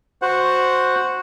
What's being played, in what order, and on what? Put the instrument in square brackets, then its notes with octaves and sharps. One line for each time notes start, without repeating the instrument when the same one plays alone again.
[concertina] F#4 C5 F#5